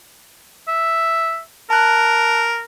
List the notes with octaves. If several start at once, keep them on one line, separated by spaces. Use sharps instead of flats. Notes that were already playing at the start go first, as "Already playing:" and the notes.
E5
A#4 A5 F#6